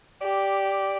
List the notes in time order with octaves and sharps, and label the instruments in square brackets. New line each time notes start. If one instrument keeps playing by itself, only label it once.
[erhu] G4 [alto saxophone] D5